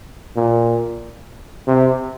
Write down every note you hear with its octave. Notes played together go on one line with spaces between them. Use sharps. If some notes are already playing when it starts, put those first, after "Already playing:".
A#2
C3